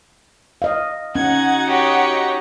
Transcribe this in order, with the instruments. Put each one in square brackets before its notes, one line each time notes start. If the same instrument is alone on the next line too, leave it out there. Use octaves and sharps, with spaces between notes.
[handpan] D#5 F5
[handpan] C#4 [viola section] D#4 F#4 F#5 [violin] G#6
[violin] G4 C#5